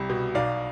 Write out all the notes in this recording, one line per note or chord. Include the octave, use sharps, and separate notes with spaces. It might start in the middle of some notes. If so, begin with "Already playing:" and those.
Already playing: C2 G3
B2
B1 D5 F5